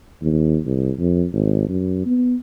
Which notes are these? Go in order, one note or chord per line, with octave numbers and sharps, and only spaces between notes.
D#2
C2
F2
G#1
F#2
B3